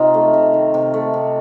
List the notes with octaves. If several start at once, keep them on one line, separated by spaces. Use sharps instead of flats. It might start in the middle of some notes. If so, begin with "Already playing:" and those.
Already playing: C3 D#4 F4
A3
C3
D#3
C3
A3
C3